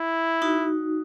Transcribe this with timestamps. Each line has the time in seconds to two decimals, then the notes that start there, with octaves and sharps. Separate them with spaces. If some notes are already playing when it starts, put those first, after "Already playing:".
Already playing: E4
0.42 D#4 F#4